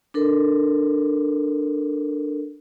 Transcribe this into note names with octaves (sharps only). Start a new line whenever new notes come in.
D4 A4 A#4